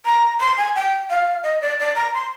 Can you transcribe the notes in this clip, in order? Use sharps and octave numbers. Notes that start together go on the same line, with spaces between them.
A#5
C6
G#5
G5
F5
D#5
D5
D5
A#5
C6